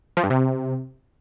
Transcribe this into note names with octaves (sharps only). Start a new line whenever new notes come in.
F3
G2
C3